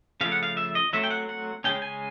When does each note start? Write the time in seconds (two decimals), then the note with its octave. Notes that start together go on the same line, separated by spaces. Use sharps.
0.21 C#3 F3 A3 F5
0.32 F#5
0.43 F5
0.57 E5
0.75 D#5
0.93 F#3 A3 C4 E5
1.04 G5
1.10 F#5
1.29 F#5
1.64 C#3 F3 G#3 C#4 G5
1.82 G#5